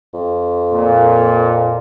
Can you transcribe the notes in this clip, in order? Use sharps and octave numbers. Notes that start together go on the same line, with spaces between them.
F2
A#2